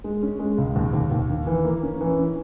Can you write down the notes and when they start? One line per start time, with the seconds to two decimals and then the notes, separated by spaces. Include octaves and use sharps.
0.04 G#3
0.22 C#4
0.39 G#3
0.58 C#2
0.76 D#2
0.93 D#2
1.11 D#2
1.30 D#3
1.47 E3
1.65 A#3
1.83 C#4
2.01 E3
2.19 C#4